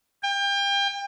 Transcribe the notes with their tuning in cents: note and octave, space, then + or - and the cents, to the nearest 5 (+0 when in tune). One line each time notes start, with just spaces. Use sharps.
G5 +30